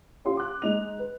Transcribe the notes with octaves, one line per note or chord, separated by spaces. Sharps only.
C#4 F4 G4 C6
D6 F#6
G#3 D#4 F7
B4